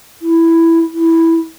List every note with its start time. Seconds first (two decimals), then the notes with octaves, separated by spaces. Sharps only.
0.22 E4
0.94 E4